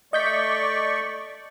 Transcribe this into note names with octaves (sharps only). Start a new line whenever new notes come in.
A3 D5 D#5 C#6 G6 B6